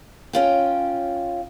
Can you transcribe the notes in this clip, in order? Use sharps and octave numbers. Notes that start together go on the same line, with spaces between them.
C#4 F4 G5